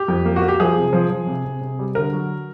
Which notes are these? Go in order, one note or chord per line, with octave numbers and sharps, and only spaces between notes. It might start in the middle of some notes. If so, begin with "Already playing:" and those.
Already playing: G4
F2
A#3
F#4
A#3
G4
F3 G#4
C3
F3
F3
C3
C3
C3
G3
D3 A#4
F#3